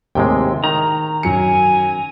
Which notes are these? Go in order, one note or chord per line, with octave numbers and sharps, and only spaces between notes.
D#2 A2 C3 G#3 G5
D#3 A#5
F#2 F#3 G#5 C#7